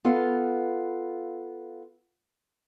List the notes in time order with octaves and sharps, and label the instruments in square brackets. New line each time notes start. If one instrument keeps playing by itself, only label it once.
[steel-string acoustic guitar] B3 F4 A4 B4 F5